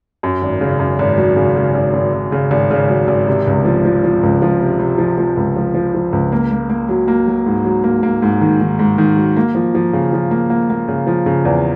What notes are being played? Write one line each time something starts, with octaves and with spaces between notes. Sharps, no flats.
F#2
G#1
C#3
F#2
G#1
F#3
C#3
C#3
G#1
G#1
G#1
C#3
G#1
C#3
F#3
G#1
C3
C#2
F3
F3
F3
C#2
F3
C3
C3
F3
F3
C#2
F3
F3
F3
C#2
A#3
A#3
A#3
F#3
A#3
F#3
G#2
F#3
A#3
A#3
G#2
D#3
D#3
G#2
D#3
F#3
A#3
F3
F3
C#3
F3
A#3
A#3
A#3
C#3
F3
C#3
E2